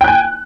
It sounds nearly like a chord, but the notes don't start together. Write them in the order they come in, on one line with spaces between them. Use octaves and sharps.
G5 F#6 G#5